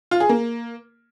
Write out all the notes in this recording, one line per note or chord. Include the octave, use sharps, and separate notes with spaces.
F4
G#4
A#3